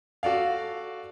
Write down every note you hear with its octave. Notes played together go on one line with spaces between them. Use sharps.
F#4 A4 D5 F5